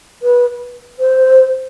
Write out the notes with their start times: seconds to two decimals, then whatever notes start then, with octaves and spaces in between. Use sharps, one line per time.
0.23 B4
1.00 C5